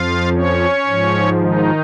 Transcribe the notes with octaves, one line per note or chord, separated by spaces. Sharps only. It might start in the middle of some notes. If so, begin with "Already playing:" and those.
Already playing: F2 F3 F4 F5
C#4 C#5
G#2 F3
D#3 D#4